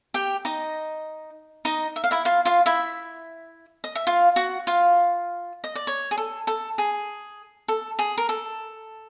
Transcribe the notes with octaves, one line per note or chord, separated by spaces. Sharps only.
G4 G5
D#4 D#5
D#4 D#5
E5
F5
E4 E5
F4 F5
F4 F5
E4 E5
D#5
E5
F4 F5
F#4 F#5
F4 F5
D#5
D5
C#5
G#4
A4
A4
G#4
A4
G#4
A#4
A4